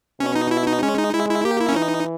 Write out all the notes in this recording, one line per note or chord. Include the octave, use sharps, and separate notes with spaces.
B2 C#4
D#4
E4
D#4
G#3 C#4
D#4
G#3 E4
E4
A#3 G4
E4
C#4
E3 D#4